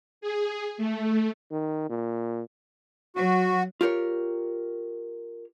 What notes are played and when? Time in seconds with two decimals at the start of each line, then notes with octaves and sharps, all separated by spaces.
0.21 G#4
0.77 A3
1.51 D#3
1.90 A#2
3.16 F#3 F#4
3.81 F4 G4 A#4 C#5